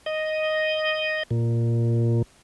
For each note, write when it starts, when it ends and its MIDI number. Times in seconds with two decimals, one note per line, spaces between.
0.06 1.23 75
1.31 2.22 46